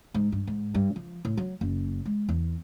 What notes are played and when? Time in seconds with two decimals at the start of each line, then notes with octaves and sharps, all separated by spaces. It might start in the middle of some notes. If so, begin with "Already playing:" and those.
0.14 G#2
0.32 G2
0.47 G#2
0.75 G2
0.96 F3
1.25 A2
1.37 F#3
1.61 F#1
2.06 G#3
2.29 E2